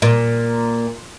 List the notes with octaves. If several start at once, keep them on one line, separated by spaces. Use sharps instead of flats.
A#2